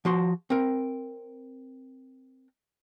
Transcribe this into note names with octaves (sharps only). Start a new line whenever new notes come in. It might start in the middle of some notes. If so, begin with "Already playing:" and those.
F3 F#4 C6
C4 A#4